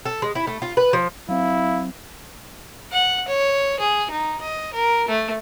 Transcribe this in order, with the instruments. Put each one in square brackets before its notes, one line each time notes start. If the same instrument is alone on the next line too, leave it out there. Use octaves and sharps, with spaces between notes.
[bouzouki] A4
G#3
E4
A3
F4
B4
F3
[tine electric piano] F#3 C4 [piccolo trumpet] E4 [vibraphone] F5
[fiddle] F#5
C#5
G#4
D#4
D#5
A#4
A3